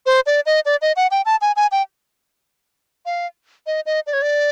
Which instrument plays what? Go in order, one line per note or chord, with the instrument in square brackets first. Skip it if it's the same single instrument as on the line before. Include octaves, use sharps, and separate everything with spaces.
[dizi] C5
D5
D#5
D5
D#5
F#5
G5
A5
G#5
G#5
G5
F5
D#5
D#5
D5
C#5
D5